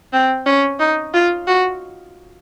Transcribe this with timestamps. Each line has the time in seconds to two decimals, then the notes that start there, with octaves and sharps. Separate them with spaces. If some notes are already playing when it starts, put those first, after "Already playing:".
0.13 C4
0.46 C#4
0.80 D#4
1.13 F4
1.47 F#4